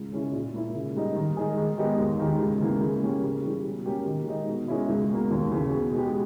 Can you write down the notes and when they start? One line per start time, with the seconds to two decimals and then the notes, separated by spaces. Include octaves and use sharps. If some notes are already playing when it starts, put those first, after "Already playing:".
Already playing: C#2
0.12 C#3 G#3 C#4 E4
0.33 A#2
0.54 A#3 E4
0.74 C#3
0.96 G3 A#3 D#4
1.16 D#3
1.37 G#3 D#4 G#4
1.57 D#3
1.78 G#3 B3 D#4 G4
1.99 D#2
2.19 D#3 G#3 D#4 G4
2.41 C#2
2.60 C#3 E3 A#3
2.82 C#3
3.03 E3 A#3 C#4 G4
3.23 C#3
3.44 E3 G3
3.64 B2
3.86 A#3 C#4 G4
4.06 D#3
4.27 G#3 D#4
4.48 B2
4.68 G#3 C#4 E4
4.89 C#2
5.10 B2 A#3
5.31 D#2
5.51 C#3 E3
5.72 B2
5.93 G#3 B3 G4